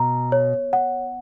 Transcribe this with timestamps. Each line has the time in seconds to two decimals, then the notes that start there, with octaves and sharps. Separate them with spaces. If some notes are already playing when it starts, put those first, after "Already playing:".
Already playing: B2 A#5
0.32 C#5
0.73 F#5